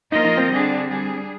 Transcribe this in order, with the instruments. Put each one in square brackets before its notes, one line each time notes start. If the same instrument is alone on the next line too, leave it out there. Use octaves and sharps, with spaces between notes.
[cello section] F3 A#3 F4 A#4 D#5 [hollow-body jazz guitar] D#4
[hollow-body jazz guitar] D#4
C4
[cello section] D3 G3 D4 G#4
G3 D4 G#4